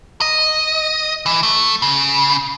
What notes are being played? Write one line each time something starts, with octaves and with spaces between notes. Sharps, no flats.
D#5
E3
A3
C#3